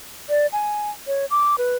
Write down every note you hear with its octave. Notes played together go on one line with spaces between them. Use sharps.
D5
G#5
C#5
D6
B4